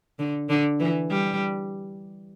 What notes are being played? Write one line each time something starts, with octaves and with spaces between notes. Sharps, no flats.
D3
D3
E3
G3